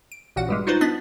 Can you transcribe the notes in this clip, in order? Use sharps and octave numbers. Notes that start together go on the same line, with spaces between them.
D7
A1 A#2 F#4 F#5
G2 G3 G#3
D#4 F4 F#4 B4 C5
B3 D4 D#5 A6 B6